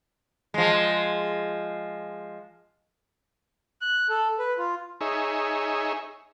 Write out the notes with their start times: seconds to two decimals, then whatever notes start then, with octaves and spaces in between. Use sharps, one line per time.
0.54 F3 G#3
3.81 F#6
4.09 A4
4.39 B4
4.58 F4
5.01 D#4 G#4 C#5 E5